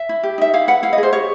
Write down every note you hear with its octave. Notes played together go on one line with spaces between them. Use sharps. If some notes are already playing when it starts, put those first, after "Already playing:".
Already playing: E5
E4
G4
D#4 E5
E4 F5
B4 F#5
E4 F5
D#5
G#4
C5
G4 C#5